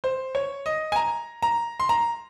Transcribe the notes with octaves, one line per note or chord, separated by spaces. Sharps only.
C5
C#5
D#5
G#5
A#5
A#5
C6
A#5